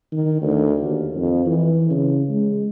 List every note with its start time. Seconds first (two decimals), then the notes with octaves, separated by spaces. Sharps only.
0.12 D#3
0.42 D2
0.82 D#2
1.15 F2
1.46 E3
1.90 C#3
2.29 G#3